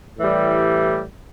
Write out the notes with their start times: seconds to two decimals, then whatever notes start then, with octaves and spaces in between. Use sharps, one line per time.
0.18 A2 E3 G3